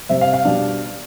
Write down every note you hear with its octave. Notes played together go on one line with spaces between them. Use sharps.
C3 G3 C4 E5
F5
F5
B2 G3 D4